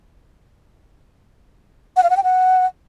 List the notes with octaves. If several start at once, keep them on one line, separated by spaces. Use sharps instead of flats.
F#5
F5
F#5
G5
F#5